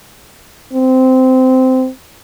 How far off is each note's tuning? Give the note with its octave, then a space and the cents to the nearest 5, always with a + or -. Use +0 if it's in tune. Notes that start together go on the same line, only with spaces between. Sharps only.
C4 -15